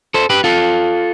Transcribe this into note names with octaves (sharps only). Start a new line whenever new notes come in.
A4 C5
G4 B4
F4 A4